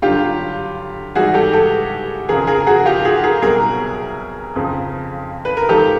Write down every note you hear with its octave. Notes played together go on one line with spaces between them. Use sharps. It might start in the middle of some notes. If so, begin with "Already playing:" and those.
G2 D3 F#3 F4 G4
G#2 E3 G3 F#4 G#4
G4 A4
G4 A4
F2 C#3 F3 G#4 A#4
G#4 A#4
F#4 G#4
F4 G4
F#4 G#4
G#4 A#4
C2 B2 F#3 G#4 A#4
F2 C#3 F3
B4
A#4
G#2 F3 G4 A4